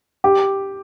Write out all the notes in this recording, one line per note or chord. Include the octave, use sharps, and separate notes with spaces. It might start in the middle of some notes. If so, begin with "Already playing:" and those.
G4